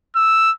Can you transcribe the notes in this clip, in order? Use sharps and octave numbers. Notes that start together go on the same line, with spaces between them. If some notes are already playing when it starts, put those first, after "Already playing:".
E6